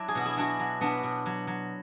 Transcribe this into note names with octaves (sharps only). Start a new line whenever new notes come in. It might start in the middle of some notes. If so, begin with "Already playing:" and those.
Already playing: F#3 D4 E4
G#4
B2 F#4
E4 G#4
F#3 D4 F#4
F#3
B2 B3 D4
B2
F#3
F#3